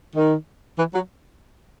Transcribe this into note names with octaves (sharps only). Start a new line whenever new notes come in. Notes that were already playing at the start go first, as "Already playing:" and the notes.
D#3
E3
F#3